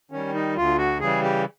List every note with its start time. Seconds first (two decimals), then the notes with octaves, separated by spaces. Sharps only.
0.11 D#3 G3 C#4
0.34 D#4
0.56 D2 F4
0.78 F#4
1.00 C#3 E3 G3 G#4
1.23 G4